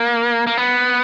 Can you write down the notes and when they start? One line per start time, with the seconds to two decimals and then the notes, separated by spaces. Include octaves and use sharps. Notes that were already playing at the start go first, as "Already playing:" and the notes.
Already playing: A#3
0.47 A#3
0.57 B3